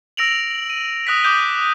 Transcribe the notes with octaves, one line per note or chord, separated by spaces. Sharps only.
E6 A#6 D7 F7 F#7
D#7
D#6 F#6 A#6 B6
D6 D#6 G6 D#7 G7